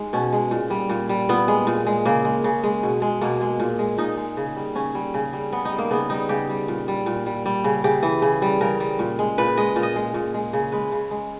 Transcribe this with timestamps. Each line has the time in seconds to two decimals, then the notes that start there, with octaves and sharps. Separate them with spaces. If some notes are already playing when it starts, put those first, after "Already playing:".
Already playing: G#3 D#4
0.13 B2 C#4
0.33 G#3
0.51 A#2
0.70 G3
0.90 A#2
1.09 G3
1.29 A#2 B3
1.48 G#3
1.67 A#2
1.87 G#3
2.06 C#3 A#3
2.25 G#3
2.44 C#3
2.64 G#3
2.83 B2
3.02 G#3
3.21 B2 A#3
3.41 G#3
3.60 A#2
3.79 G#3
3.98 A#2 D#4
4.17 G#3
4.37 C#3
4.57 G3
4.75 C#3 C#4
4.95 G3
5.14 C#3
5.33 G3
5.53 C#3 B3
5.65 D#4
5.71 G3
5.78 A#3
5.91 C#3 B3
6.10 G3 D#4
6.29 C#3 G4
6.49 G3
6.68 A#2
6.88 G3
7.06 A#2
7.26 G3
7.46 G3
7.64 C#3
7.84 C#3 G4
8.03 E3
8.22 C#3
8.42 G3
8.61 C#3 A#4
8.80 G3
8.99 A#2
9.19 G#3
9.38 A#2 B4
9.57 G#3 D#5
9.76 A#2
9.83 D#5
9.96 G#3
10.14 A#2
10.34 G#3
10.53 C#3
10.72 G#3 B4
10.92 C#3
11.11 G#3